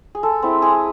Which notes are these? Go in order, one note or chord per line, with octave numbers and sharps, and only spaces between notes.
G#4
G#3 A4
C4 E4
G#3 G#4